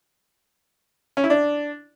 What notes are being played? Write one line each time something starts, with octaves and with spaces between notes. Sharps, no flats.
C#4
E4
D4